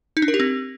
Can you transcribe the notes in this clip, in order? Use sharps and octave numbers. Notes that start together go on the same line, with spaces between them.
D#4
D4
A#4
G4
C4